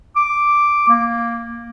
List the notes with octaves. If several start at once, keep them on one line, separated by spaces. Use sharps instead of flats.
D6
A#3